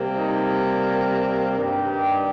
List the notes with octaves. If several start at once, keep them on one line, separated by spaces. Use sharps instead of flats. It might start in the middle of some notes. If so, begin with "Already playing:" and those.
Already playing: C3 G3 A#3
D#4
G2 D#3 G3 A#3 G4